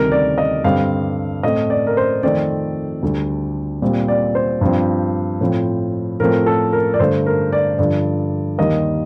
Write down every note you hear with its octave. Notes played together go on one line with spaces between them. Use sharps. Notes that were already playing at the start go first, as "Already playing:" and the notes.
Already playing: D2 C3 D#3 G3 A#4
D5
D#5
G2 D3 G3 C4 F5
A2 A3 C4 D#5
D5
A#4
C5
F2 D#3 A3 C4 D5
D2 D3 G3
A#2 G3 C4
D5
C5
G2 F3 C4
A2 F3 C4
A2 F3 A3 C4 A#4
A4
A#4
D5
G2 D3 A3 C5
A#4
D5
G2 D3 F3 D5
D#2 D#3 G3 A#3 D#5